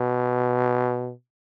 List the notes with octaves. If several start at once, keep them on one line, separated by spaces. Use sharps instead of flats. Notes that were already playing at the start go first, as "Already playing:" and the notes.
Already playing: B2